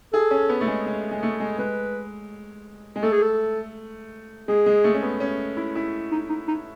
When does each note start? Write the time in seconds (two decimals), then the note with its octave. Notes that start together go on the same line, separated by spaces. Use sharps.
0.13 G#4 A4
0.31 C#4
0.49 B3
0.61 A3
0.67 G#3
0.86 G#3
1.11 G#3
1.23 A3
1.40 G#3
1.58 G#3 B4
2.96 G#3
3.03 A3 A4
3.12 G#4
3.22 A4
4.48 G#3 G#4
4.66 G#3
4.84 A3
4.94 C#4
5.03 B3
5.20 C#4
5.57 E4
5.76 E4
6.12 D#4
6.29 D#4
6.48 D#4